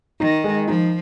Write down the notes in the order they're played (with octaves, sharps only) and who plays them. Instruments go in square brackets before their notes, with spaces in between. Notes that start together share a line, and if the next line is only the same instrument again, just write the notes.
[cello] D#3 [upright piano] D#4
[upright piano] G#3
[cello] F3 [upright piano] D#4